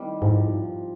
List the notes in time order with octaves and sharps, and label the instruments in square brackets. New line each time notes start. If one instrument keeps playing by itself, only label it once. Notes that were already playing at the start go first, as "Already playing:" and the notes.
Already playing: [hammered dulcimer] C3 D#3 G3
[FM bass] G#2 [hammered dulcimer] F3